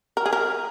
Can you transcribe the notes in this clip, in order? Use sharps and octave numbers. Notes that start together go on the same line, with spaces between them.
A#4
G#4
A#4